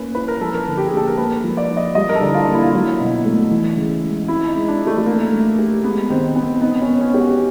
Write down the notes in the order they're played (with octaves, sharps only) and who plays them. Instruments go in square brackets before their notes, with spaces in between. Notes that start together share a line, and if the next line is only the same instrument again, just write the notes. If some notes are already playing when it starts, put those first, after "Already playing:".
Already playing: [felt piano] A#3 C#4 [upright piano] B4
[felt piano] E4 [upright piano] B4
[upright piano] A#4
[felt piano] F3 [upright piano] A4
[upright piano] A#4
[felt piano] D3
[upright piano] G4
G#4
[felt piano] A#3 [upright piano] A4
[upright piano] A#4
[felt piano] A#3 [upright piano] B4
[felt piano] F3
[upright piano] D5
[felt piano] D#4
[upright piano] D#5
[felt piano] G3 [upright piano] D#5
[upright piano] A#4
A4
[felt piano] D3
[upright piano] E4
F4
[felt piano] A#3
[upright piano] E4
F4
[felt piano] F#3 [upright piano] E4
[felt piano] B2
A3
E3
C#3
G#3
[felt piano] C4 [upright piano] E4
[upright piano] D#4
[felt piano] G#3
[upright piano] D4
[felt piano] F4
[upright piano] A3
A3
[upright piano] A#3 [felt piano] D4
[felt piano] A3
G4
[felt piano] G#3 [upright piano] B3
[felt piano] D#3 [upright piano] C4
[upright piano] B3 [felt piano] C4
[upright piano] B3 [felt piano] D#4
[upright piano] C#4
[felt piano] B3
[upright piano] C#4
[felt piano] G4
[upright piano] F#4